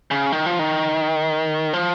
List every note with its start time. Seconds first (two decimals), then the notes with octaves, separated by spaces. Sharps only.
0.11 C#3
0.32 D#3
0.46 F3
0.59 D#3
1.73 F3